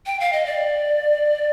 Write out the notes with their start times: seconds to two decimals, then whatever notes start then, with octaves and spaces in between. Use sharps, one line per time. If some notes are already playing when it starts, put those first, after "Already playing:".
0.06 G5
0.20 F5
0.33 D#5
0.46 D5